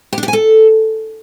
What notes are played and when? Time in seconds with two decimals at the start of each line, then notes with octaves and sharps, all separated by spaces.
0.13 G4
0.18 D4
0.23 G4
0.28 G#5
0.33 A4